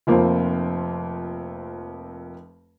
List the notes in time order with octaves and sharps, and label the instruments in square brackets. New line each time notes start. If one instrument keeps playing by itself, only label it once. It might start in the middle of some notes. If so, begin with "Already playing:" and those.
[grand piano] F1 F2 A#3 C5